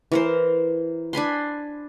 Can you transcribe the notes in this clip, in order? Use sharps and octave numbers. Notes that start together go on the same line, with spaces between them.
E3 A#4 C5
D4 G#5 B5 C6